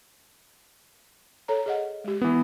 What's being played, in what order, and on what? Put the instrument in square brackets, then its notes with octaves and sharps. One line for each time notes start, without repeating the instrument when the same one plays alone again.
[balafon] A4 C#5 A#5
G#4 D#5 F#5
G#3 G4
[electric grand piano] E3 B3